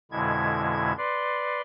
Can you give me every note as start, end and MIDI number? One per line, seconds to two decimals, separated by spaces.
0.11 0.93 41
0.11 0.93 47
0.11 0.93 50
0.11 0.93 56
0.11 0.93 64
0.11 0.93 92
0.98 1.61 71
0.98 1.61 74
0.98 1.61 84